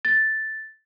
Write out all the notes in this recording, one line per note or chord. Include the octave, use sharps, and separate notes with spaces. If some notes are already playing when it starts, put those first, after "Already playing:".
A6